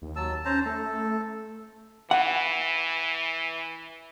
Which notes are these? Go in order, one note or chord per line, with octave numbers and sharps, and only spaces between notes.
D#2
F#3 A5 E6
C#4 C5 A5 A#5
A3 A4
E3 F#5